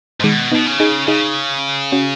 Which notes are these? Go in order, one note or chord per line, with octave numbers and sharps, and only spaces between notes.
G#2
B2 D#3 G#3
B2 B3 D#4
C#3
D#4 G#4
C#3 D#4 G#4
C#4 F#4